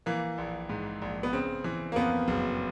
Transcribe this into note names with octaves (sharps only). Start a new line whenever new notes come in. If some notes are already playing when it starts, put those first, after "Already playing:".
E3 A#3
A#1
G#2
A#1
B3
C#3 C4
E3
A#3
F2 B3
F#1